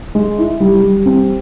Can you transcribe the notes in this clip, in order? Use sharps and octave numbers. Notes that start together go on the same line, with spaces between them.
G#3
E4
G3
G3
C4